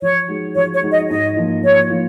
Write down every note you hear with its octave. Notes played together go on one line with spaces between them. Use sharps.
F3 C#5
G#3 D#4 F#4
F3 C#5
C#5
G#3 D#4 F#4
D#5
G#2 D#5
F3 A#3 F4
G#2 C#5
F3 A#3 F4